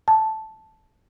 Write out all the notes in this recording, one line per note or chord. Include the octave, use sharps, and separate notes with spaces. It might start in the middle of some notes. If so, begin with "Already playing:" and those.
A5